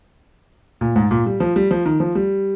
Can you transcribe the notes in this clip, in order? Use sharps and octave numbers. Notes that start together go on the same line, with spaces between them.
A#2
G#2
A#2
G3
F3
G3
F3
D#3
F3
G3